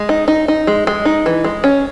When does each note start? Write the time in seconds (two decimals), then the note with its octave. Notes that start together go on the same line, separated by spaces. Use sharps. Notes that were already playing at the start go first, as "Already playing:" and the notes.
Already playing: G#3
0.09 D#4
0.28 D#4
0.48 D#4
0.67 G#3
0.87 G#3
1.05 D#4
1.26 E3
1.44 G#3
1.64 C#4